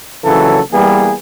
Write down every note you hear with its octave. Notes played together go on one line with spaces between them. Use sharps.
A#1 C#3 E3 F#3 A4
E3 G3 A#3 B3 G#4